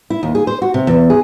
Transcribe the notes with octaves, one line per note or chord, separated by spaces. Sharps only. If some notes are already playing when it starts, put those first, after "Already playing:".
E4
D#2
G#4
C5
F#4
C3
E2
G#4